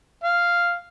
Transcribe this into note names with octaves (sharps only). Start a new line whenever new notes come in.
F5